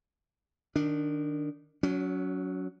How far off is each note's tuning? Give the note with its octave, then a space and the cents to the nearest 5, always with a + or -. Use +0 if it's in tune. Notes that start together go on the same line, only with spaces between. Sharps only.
D#3 -15 D4 +0
F#3 +0 C#4 +35